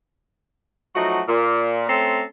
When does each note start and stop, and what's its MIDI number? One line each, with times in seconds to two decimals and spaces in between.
0.95 1.22 53
0.95 1.22 54
0.95 1.22 57
0.95 1.22 63
0.95 1.22 66
1.28 1.85 46
1.88 2.23 57
1.88 2.23 60
1.88 2.23 61
1.88 2.23 69
1.88 2.23 82
1.88 2.23 84